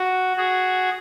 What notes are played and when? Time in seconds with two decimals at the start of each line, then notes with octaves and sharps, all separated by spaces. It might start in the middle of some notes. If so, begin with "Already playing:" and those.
Already playing: F#4
0.37 F#4 G#4